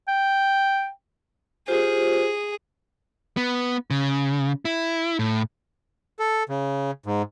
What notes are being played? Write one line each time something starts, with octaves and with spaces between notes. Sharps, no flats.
G5
F4 G4 G#4 C5
B3
C#3
E4
A2
A4
C#3
G#2